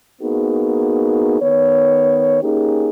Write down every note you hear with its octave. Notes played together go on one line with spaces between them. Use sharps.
A#3 B3 D#4 F#4 G#4
D#3 B3 C#5
A#3 C#4 D#4 G4 G#4